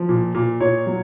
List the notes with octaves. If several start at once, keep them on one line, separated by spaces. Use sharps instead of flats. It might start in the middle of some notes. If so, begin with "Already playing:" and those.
Already playing: F3
A#2
A#2
A#2 C#5
F#3